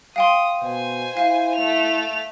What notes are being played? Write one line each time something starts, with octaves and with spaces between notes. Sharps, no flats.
F5 G5 C6 D#6
B2 C5 G#5
E4 F5
A3 F7